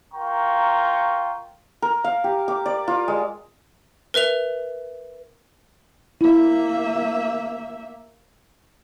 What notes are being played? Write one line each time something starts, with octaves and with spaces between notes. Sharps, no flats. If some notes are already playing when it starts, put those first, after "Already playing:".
F4 A#4 G5 A#5 C#6
A#4
F5
G4
D6
D5
F4
G#3
A#4 B4 E5 F7
A#3 E4 E5